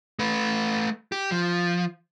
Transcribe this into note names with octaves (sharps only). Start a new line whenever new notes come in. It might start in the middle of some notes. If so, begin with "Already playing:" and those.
A3 B4
G4
F3